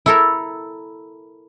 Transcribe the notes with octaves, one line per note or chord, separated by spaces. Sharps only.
E4 A4 A#4